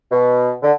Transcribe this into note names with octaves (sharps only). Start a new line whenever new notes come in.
B2
D3